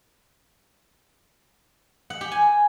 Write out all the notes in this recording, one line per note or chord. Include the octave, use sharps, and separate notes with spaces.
F#5
G4
G#5